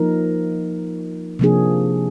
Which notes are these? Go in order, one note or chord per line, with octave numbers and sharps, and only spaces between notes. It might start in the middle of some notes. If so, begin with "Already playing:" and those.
Already playing: F3 A#3 D#4 A#4
C3 F3 A#3 D4 G#4